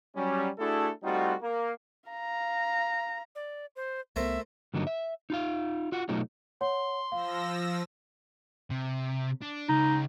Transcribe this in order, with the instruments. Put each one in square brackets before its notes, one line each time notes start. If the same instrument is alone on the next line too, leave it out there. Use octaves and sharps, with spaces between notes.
[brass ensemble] F#3 G3 C#4
A3 D4 E4 F#4 G#4 A4
G3 A3 C4 D#4 F4 F#4
A#3
[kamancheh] F5 A#5
[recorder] D5
C5
[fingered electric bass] C2 B3 [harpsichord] A3 A#4 C5 [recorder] E5
[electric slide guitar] G2 D3 F#3 A#3 D#4
E5
D#4 F4 F5
F4 F#4 F#5
B2 F#3 A3 D#4 F4
[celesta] C#5 F#5 [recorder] C6
[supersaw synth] F3 E6 A#6 [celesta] F5
[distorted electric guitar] C3
D4
[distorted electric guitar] C#2 [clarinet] D#4